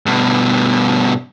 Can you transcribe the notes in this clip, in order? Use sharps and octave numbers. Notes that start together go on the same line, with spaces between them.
G2 B2